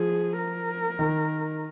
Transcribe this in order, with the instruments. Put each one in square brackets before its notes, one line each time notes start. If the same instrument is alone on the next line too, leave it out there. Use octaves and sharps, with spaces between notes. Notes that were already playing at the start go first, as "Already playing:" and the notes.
Already playing: [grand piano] F3 [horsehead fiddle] G#4
[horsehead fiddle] A#4
[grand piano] D#3